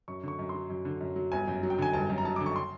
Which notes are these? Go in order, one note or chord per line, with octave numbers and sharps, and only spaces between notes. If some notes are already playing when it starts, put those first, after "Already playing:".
F#2 C#6
D3 C#6
F#2
C6
F#3
F#2
D3
F#2
F#3
G1 G#5
F#2
F#3
G5
D3 G#5
G1 A5
F#2
A#5
F#3 A5
D3 D6
C#6
C6